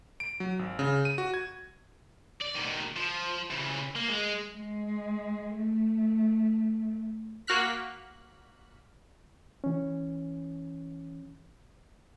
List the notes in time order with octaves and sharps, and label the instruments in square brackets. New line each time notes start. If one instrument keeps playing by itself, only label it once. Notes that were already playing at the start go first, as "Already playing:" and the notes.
[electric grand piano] D7
F#3
G#1
C#3
D#7
F#4
G#6
[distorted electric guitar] D5
B2 D#3
F3
C#3 E3
A#3
G#3
[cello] G#3
A3
[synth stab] A#3 F#4 F6 F#6 B6
[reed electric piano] E3 C#4